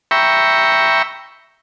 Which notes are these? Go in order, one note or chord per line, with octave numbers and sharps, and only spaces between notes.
E5 G5 A#5 B5 C#6